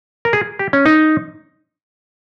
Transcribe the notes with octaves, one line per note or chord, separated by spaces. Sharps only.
A#4
G#4
G4
C#4
D#4